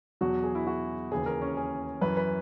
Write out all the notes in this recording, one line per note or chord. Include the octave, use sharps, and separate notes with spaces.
E2 B2 F#3 F#4
G#4
E4
F#4
D#2 C#3 E3 G#4
A#4
C#4
G#4
F#2 E3 B4
B4